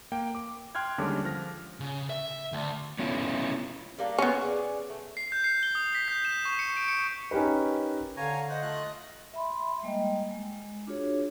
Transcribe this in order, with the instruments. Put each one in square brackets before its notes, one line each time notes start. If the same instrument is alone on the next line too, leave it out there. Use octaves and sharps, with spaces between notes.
[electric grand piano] A#3 G5
D6
G5 C6 F6 F#6 G#6
D#2 D3 G3 G#3 C#4 D6
F3 F6 A#6
[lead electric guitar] C#3
E5
D2
[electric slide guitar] B3 C#4 E4 F4
[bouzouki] G3 A#3 D4
[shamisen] B3 C#4 [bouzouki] F#4 G#5
[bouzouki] G#4 D5
A3
[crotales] C7
G6
C7
G7
D#6
B6
G6
E7
C#6
C#7
D7
C#7
[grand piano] C#4 D#4 G4 A#4 B4
[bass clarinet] D3 [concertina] C#5 G#5 A#5 [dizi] F5
[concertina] C5 F#5 [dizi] D#5
[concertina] A3 F4 F#6
[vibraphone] E5 B5 C6
G3 G#3 A#3 D#5 G5
G#3
D4 F4 F#4 G#4 C#5